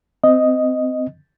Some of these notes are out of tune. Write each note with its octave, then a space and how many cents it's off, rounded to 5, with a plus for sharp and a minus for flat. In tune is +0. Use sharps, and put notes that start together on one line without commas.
C4 -25 D#5 +0